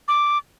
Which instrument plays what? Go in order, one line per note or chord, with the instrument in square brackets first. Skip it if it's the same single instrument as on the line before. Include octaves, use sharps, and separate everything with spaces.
[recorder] D6